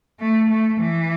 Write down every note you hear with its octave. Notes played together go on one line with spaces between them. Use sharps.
A3
A3
E3